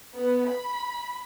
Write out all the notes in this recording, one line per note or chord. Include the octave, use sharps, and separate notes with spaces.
B3
B5